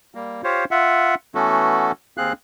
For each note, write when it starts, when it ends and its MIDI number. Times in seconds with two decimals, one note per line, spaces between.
0.15 0.42 55
0.15 0.42 58
0.44 0.65 65
0.44 0.65 67
0.44 0.65 72
0.44 0.65 73
0.44 0.65 77
0.71 1.15 65
0.71 1.15 76
0.71 1.15 78
1.35 1.92 52
1.35 1.92 57
1.35 1.92 59
1.35 1.92 61
1.35 1.92 66
1.35 1.92 69
2.18 2.33 39
2.18 2.33 60
2.18 2.33 68
2.18 2.33 77
2.18 2.33 90